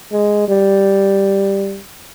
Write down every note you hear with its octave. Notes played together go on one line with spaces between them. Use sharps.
G#3
G3